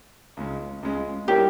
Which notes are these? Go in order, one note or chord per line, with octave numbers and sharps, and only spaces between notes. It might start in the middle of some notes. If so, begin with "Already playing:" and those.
C#2 C#3 G#3 C#4
C#2 C#3 G#3 C#4
G3 A#3 E4 G4 A#4 C#5